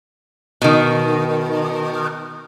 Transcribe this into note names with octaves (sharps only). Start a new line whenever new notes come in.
B2 D#3